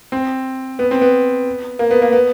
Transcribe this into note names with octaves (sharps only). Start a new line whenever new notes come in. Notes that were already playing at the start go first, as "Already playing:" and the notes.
C4
B3
C4
B3
A#3
B3
A#3
B3